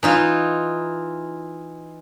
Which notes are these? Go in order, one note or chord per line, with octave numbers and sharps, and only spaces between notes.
E3 D#4 F4